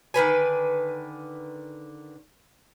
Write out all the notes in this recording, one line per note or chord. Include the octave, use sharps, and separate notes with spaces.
D3 D#3 B4 G#5